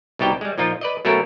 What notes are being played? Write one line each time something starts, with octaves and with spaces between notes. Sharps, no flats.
C2 B2 D#4 G4 G5
G3 G#3
A#2 F3 D#4 F4
B4 D5 D#5
B2 F#3 A3 C#4 A4 A#4